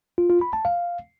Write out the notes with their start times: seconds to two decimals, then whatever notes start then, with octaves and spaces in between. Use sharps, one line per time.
0.18 F4
0.30 F4
0.41 B5
0.53 A5
0.65 F5